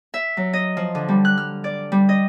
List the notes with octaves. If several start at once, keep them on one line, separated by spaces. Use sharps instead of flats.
E5
F#3
D#5
F3
D3
G3
F#6
F6
D5
G3
D#5